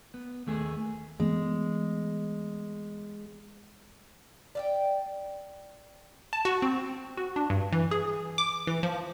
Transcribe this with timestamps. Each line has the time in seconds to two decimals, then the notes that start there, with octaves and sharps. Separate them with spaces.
0.14 B3
0.47 D#2 A3 G#4
1.20 E3 G#3 A3 B3
4.55 D5 E5 G5
6.33 A5
6.45 F#4
6.62 C4
7.17 F#4
7.36 D4
7.50 G2
7.73 E3
7.91 G#4
8.38 D6
8.67 E3
8.83 F3